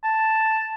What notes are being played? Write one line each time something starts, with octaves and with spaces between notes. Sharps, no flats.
A5